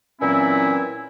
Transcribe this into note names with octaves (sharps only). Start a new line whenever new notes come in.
A#2 E3 F#3 C4 C#4 E4